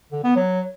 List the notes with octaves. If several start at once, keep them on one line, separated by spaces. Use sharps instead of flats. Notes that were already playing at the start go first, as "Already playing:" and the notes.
D3
B3
F#3